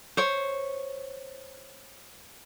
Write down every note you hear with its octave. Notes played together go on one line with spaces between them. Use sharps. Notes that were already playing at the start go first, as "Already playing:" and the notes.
C5 C#5